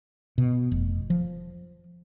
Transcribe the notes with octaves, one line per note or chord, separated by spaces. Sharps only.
B2
F1
F3